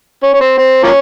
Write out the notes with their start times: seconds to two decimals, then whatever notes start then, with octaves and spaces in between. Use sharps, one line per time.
0.23 C#4
0.34 C#4
0.41 C4
0.58 C4
0.83 F3 A#3 C#4